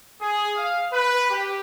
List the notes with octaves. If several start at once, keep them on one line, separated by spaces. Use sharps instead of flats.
G#4
F5
B4
G4